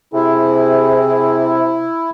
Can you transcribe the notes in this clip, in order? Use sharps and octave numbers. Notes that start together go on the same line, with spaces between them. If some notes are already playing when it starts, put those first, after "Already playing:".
C3 E4 G#4